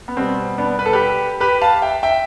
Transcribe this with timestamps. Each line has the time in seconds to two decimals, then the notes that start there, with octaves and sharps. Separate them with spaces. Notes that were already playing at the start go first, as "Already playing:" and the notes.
0.08 B3
0.17 B2 G3 C4
0.58 B3 D4
0.79 B4
0.86 A4
0.93 G4 B4
1.40 G4 B4
1.61 F5 A5
1.82 E5 G5
2.03 E5 G5